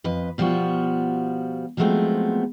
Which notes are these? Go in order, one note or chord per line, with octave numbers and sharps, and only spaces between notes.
F2 B4 D#5
B2 F3 G3 F4 F#4
F3 F#3 G#3 A3 B3 C4